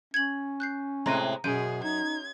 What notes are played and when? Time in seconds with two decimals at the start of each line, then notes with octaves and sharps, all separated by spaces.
0.14 C#4 G#6 F#7
0.60 F#6 G6 C7
1.06 A2 C3 G#3 A#5 A#6 D#7
1.44 F#2 B2 G#4 G6 D7 D#7
1.84 D#4 G#6